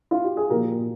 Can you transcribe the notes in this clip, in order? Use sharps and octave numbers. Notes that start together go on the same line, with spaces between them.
F4
G4
G#4
A#2 F3 G4 A#4
A#2